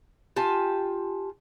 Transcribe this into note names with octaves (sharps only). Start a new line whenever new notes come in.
F4 G4 G#5 A5